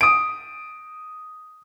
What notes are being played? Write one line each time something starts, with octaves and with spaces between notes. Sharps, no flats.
D#6 D7